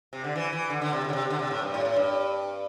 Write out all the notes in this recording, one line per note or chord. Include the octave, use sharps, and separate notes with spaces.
C3
D3
E3
E3
D3
D3
C3
A2
D3
C3
D3
C3
A2
G2
A2
A2
G2